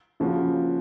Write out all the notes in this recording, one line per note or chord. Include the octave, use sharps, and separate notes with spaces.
C#3 F3 A#3 C#4 F#4